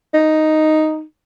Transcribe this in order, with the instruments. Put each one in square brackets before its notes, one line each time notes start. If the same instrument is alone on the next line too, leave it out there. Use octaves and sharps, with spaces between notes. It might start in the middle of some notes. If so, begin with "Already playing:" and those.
[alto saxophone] D#4